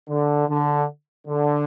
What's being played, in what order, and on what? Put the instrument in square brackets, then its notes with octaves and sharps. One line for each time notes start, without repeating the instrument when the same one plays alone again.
[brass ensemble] D3
D3
D3